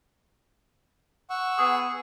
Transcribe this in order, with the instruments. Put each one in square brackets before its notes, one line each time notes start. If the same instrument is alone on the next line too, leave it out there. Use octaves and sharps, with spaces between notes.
[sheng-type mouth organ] F#5 C#6 E6
[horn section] B3 G#4